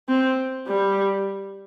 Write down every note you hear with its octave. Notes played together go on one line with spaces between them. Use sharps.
C4
G3